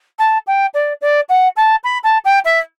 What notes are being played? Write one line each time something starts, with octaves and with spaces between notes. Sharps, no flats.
A5
G5
D5
D5
F#5
A5
B5
A5
G5
E5